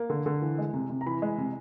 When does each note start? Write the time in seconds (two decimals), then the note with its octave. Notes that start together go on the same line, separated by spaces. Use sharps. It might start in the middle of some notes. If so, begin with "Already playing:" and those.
Already playing: A#3
0.10 D3
0.26 D3
0.42 E3
0.58 G#3
0.74 C3
0.90 C3
1.01 A#5
1.06 E3 B5
1.22 G#3
1.38 C3